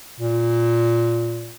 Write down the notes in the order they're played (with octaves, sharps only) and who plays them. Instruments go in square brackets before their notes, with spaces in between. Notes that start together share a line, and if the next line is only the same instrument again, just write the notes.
[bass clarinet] A#2